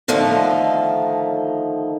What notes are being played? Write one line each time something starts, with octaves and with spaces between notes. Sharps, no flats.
D3 D#3 F3 A3 D#4